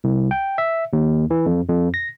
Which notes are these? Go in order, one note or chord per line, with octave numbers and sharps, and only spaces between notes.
C2
G5
E5
D#2
E3
F2
F2
A#6